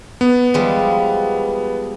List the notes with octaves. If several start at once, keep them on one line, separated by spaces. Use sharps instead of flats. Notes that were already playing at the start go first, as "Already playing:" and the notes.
B3
F3 G3 G#3